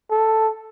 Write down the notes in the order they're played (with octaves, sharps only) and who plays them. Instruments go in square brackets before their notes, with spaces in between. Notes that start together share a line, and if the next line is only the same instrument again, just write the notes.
[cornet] A4